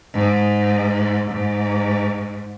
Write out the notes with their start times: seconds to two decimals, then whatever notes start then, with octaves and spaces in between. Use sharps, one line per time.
0.14 G#2
1.31 G#2